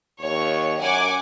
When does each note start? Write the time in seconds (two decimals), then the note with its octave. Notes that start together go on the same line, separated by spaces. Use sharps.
0.21 D#2 C#5
0.79 F#2 F#5 G#5 D6